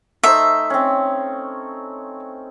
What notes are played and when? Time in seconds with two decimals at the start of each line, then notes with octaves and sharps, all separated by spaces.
0.23 A3 D#4 C5 E5
0.70 C4 C#4